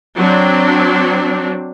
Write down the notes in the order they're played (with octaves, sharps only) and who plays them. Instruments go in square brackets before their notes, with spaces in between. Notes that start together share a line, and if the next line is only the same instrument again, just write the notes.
[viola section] F#3 C4 D4